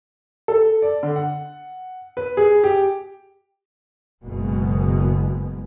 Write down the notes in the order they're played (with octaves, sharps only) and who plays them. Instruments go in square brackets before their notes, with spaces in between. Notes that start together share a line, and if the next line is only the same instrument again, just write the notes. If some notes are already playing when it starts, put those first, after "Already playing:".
[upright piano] A4
D5
D3
F#5
B4
G#4
G4
[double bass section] F#1 B2 G#3